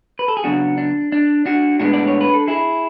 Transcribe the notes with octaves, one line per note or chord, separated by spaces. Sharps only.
B4
A4
G#4
C#3 F#3 B3 D4 F#4
D4
D4
D4 F#4
A2 G#3 B3 D4 F#4
D5
C#5
B4
A4
E4 G#4